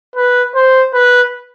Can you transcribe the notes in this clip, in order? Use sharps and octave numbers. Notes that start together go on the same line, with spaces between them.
B4
C5
B4